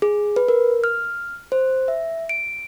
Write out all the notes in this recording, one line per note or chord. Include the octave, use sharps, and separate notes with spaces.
G#4
B4
A#4
F6
C5
E5
D7